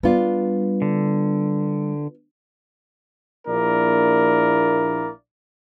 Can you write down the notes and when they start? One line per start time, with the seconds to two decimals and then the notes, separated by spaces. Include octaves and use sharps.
0.03 G3 B3 D4 F4
0.82 D3
3.47 A#1 A#3 D4 E4 A#4 D5